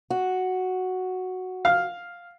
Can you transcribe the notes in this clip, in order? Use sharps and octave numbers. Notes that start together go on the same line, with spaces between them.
F#4
F5 F6